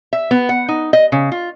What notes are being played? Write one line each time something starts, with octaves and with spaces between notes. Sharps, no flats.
E5
B3
F#5
D#4
D#5
C#3
F4